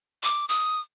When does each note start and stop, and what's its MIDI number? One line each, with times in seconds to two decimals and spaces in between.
0.24 0.46 86
0.49 0.81 87